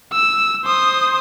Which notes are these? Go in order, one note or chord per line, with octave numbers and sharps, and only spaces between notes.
E6
C5 D#6